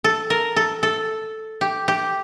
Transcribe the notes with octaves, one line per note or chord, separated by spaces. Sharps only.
A4
A#4
A4
A4
G4
G4